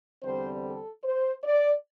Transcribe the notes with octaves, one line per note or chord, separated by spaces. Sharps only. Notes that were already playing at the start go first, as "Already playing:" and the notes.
E2 D3 G3 C4 C5
A4
C5
D5